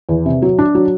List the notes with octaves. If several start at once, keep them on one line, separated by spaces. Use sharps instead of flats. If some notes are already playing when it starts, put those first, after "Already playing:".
E2
C3
F#3
D4
F#3